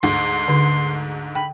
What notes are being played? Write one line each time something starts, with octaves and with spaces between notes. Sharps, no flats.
D2 G#2 C6
D3
G5 B5